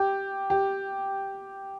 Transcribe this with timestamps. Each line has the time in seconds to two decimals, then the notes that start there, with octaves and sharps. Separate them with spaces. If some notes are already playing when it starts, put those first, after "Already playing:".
Already playing: G4
0.50 G4